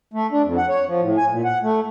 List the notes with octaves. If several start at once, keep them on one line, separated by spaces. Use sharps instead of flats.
A3
D4
F2
F#5
C#5
F3
A2
G#5
A#2
F#5
A3